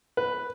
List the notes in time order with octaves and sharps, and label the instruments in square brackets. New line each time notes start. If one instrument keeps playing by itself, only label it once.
[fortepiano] B4